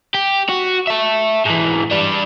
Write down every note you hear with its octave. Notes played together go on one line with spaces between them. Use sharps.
G4
F#4
E5 A5
G#2 E3
G3 D4